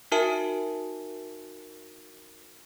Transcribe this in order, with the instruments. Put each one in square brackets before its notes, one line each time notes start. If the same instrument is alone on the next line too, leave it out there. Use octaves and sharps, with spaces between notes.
[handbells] D#4 F#4 A#4 E5 G#5 A5